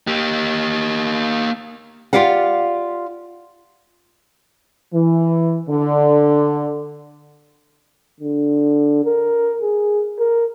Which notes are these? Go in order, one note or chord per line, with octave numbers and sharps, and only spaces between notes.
A#3 G4
F4 G4 D5 F5 F#5
E3
D3
D3
A#4
G#4
A#4